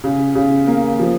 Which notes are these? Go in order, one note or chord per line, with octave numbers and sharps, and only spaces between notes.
C#3
C#3
A#3
F3